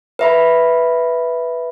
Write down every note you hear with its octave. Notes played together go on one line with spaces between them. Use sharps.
B4 E5 B5